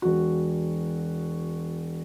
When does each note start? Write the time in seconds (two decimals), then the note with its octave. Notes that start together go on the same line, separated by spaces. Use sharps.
0.02 E1 F#4